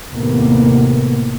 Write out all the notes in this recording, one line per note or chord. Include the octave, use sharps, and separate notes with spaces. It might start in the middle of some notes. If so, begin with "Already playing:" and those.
D#2 A2 C3 A#3 B3